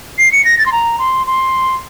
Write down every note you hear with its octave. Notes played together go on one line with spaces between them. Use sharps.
C7
C#7
A#6
A6
C6
A#5
C6
C6